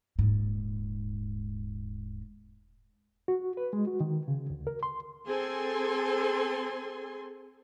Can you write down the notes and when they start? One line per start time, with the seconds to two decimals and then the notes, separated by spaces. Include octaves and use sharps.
0.19 D#1 G#2
3.28 F#4
3.57 B4
3.73 G#3
3.87 F#4
4.00 D#3
4.28 C#3
4.50 D2
4.67 A#4
4.83 C6
5.26 C4 G#4 A4 G#5 C6